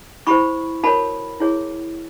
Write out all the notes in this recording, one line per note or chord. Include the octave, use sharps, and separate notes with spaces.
E4 G4 C5 B5 C#6
F#4 A#4 C#5 A5 B5
E4 G#4 C#5